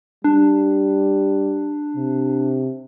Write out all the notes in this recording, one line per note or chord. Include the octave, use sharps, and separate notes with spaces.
G3 D4
C3